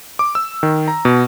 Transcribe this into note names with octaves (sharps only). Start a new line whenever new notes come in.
D6
E6
D#3
A#5
B2